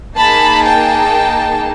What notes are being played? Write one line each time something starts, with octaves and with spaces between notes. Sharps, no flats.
A#3 D#4 G#4 A5 B5
G5 A5